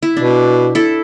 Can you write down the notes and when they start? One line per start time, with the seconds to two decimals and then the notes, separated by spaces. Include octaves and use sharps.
0.03 E4
0.17 B2 D4
0.75 E4 A4